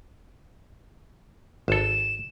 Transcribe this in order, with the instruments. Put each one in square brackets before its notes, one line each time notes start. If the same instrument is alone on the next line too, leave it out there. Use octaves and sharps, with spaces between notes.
[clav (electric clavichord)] G#1 A4 [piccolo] E7